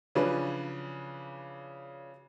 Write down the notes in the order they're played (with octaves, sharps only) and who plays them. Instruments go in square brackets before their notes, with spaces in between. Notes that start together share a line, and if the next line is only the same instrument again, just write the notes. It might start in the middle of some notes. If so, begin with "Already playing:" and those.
[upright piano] C#3 F3 F#3 C#4 D4 B4